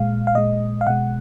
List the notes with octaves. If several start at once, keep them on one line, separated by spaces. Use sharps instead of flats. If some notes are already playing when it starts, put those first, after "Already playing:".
Already playing: A#2 G#3 F5
F5
A#2 G#3 D#5
F5
B2 G#3 F#5